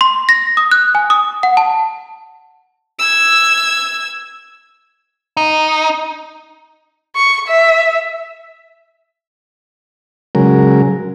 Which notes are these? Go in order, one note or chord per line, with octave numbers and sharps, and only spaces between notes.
C6
A#6
D#6
F#6
G#5
D#6
F#5
A5
E6 G#6
D#4
C#6
E5
C#3 F#3 G#3 A#4